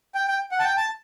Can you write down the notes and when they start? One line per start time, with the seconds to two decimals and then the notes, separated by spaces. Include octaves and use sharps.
0.15 G5
0.27 G5
0.52 F#5
0.60 A5
0.64 G5
0.77 A5